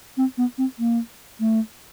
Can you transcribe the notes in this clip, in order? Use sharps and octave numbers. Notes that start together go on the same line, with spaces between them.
C4
B3
C4
A#3
A3